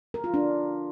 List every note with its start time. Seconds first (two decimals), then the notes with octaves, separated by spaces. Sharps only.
0.14 A#4
0.24 F4
0.34 D4